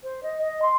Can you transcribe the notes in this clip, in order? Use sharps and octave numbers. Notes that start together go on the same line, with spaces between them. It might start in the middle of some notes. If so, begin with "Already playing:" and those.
C5
D#5
D#5
C6